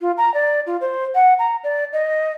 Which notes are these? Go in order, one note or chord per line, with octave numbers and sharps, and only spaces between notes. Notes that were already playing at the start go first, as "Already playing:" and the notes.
F4
A#5
D5
F4
C5
F#5
A#5
D5
D#5